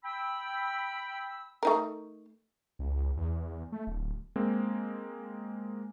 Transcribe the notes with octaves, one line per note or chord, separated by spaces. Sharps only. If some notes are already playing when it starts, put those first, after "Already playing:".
G5 B5 E6
A3 D#4 A#4
C#2
E2
A3
D1
G#3 A#3 C4